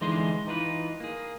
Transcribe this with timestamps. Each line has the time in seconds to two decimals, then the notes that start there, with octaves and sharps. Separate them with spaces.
0.01 D3 E3 G#3 D#4 G#4 C6
0.47 E3 D#4 F4 B4
1.00 A#3 G#4